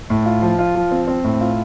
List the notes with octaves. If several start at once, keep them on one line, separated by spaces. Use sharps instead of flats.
A2
F4
F3
F4
F3
C4
C4
A2
F4